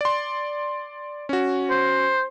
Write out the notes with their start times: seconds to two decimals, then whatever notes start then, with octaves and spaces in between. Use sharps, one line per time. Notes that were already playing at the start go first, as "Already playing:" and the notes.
0.01 D5 C6
1.29 C#4 F#4
1.70 C5